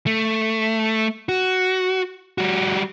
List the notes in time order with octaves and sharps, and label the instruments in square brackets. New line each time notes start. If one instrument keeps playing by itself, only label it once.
[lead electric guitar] A3
F#4
G3 F#4